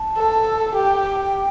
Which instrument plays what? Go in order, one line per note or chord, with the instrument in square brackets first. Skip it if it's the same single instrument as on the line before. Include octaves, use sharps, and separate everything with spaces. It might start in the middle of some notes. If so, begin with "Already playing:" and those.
Already playing: [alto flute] A5
[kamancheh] A4
[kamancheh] G4 [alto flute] G5